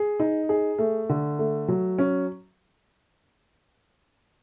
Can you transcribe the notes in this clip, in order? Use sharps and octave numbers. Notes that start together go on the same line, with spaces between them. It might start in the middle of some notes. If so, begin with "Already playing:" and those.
Already playing: G#4
D#4
G#4
A3
D3
A3
F#3
C#4